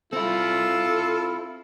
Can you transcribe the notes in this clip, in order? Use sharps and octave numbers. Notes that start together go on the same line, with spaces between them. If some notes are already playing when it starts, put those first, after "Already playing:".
C4 E4 F4 A4